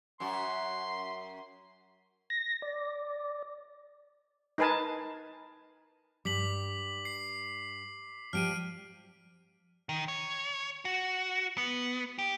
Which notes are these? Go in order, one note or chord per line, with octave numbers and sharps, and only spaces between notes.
F#2 F#4 C6
A#6
D5
D#4 A#4 B4 G#5 A5
G2 G3 D6 B6 F#7
C7
F3 G3 G4 F6 D7 D#7
D#3
C#5
F#4
B3
G4